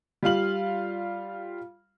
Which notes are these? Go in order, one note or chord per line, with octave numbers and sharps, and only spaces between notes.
G3 F4 F5 F#7